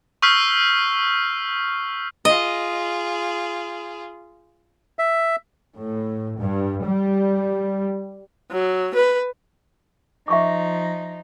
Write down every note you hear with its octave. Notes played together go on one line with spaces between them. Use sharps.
C#6 E6 F6 G6 B6 C7
F4 G#4 D#5
E5
A2
G2
G3
F#3
B4
F3 D#4 E5 C#6 D6